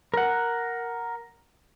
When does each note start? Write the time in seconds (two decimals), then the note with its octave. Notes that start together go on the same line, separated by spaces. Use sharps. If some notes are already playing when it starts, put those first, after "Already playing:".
0.14 A#4 F#5